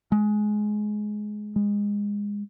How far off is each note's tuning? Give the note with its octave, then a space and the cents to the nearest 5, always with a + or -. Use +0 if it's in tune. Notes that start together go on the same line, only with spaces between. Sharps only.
G#3 +15
G#3 -20